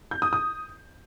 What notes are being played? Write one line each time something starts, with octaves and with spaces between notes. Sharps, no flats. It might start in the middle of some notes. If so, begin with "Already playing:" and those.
G6
D#6
D#6